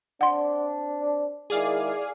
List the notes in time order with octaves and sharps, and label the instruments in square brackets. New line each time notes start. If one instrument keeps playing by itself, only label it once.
[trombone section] C4 D4 [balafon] F#5 C6
[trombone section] D#3 G#3 E4 [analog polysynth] G#4 D5 F5